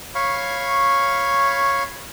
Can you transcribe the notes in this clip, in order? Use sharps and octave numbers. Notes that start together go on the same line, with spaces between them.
C#5 F5 B5 C#6